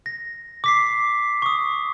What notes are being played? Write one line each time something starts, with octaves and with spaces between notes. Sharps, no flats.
A#6
D6 B6 C7
C#6 D#6